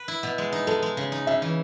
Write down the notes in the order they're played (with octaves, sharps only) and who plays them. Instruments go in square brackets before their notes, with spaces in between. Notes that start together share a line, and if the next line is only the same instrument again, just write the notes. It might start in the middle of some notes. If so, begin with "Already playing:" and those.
Already playing: [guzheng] B4
E4
B2
G#3
D#4
[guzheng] G#3 [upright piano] A4
[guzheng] G#3
C#3
D#4
[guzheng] C#3 [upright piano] E5
[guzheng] E3